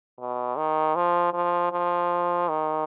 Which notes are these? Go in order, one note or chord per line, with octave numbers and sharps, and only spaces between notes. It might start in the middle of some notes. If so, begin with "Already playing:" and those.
B2
D#3
F3
F3
F3
D#3